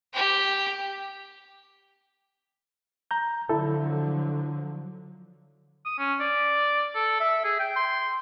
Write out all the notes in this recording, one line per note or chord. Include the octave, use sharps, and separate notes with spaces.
G4 G5
A#5 G6
D3 F3 F#3 E4 A4
D#6
C#4
D5
A4
E5
G#4
G5
C6